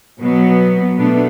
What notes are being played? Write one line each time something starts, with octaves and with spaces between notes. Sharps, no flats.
B2 F#3 B3
B2 A3 B3 D4